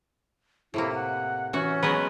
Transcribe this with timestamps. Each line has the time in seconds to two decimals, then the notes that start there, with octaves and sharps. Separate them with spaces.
0.74 A2 C3 A#3 E4
0.95 F#5
1.53 E3 C#4 F#4
1.83 F#3 G#3 B3 D#5